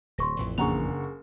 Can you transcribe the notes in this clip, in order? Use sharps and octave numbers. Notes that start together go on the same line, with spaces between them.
D1 C6 C#6 A#6
A1 F2 E3
F#1 A#3 D4 G#4 F#5 A#5 C#6 F7